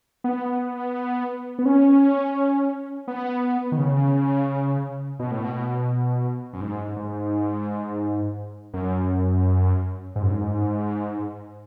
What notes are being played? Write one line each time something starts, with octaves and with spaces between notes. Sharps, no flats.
B3
B3
C#4
B3
D#3
C#3
B2
A2
B2
F#2
G#2
G#2
F#2
G#2
F#2
G#2